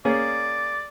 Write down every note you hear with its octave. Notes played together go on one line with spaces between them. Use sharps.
A#3 C#4 G#4 D5